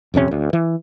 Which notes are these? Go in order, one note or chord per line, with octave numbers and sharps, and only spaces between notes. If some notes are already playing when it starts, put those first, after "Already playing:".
D#1 F2 C3 C#4
D2
E3